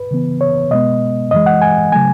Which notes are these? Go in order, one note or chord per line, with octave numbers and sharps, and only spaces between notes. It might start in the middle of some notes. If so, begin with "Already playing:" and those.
Already playing: B4
C#3 E3 B3
C#5
B2 G#3 B3 D#5
F#2 E3 G#3 D#5
F#5
G#5
C#3 F#3 A3 G#5